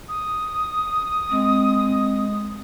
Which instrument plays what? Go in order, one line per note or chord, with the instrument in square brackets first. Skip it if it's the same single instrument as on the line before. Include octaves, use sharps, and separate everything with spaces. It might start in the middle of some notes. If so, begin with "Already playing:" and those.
[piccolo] D#6
[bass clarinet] G#3 [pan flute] C4